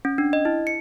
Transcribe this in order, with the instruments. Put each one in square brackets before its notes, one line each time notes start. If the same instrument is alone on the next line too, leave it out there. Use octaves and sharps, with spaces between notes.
[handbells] C#4
D4
D#5
E4
C#7